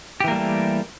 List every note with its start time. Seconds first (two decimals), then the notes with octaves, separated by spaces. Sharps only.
0.20 G4
0.24 E3
0.28 A#3
0.31 G3
0.35 A3